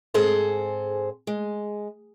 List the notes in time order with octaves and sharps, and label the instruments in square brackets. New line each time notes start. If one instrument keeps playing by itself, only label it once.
[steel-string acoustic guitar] G#2 C4 G#4 A4 C5
G#3